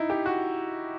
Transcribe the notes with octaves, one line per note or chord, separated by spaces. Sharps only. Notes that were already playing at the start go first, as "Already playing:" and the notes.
Already playing: D#4 E4
G4
F#4